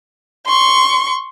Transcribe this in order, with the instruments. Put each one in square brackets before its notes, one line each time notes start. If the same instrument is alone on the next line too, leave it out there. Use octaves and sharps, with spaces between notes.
[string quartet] C6 C#6